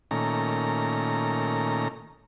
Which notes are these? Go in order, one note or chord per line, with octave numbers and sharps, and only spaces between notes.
A#2 D#3 A3 C#4 A#5